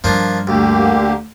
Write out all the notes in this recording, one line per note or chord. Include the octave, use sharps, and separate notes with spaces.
G2 F3 A#3 D4
D2 D3 A#3 G4